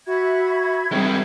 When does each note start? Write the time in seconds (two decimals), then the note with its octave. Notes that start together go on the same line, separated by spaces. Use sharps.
0.07 F#4 E5 B5 G#6
0.92 G3 G#3 C4